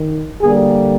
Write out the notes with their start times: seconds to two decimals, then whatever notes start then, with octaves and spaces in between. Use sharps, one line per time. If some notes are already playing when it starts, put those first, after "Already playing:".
Already playing: D#3
0.42 D3 G3 A#3 G#4